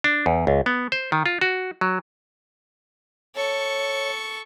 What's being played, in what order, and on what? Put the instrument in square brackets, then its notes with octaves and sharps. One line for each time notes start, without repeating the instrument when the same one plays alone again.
[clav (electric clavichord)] D4
E2
C#2
B3
C5
D#3
F4
F#4
F#3
[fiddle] A4 C#6 [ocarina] C#5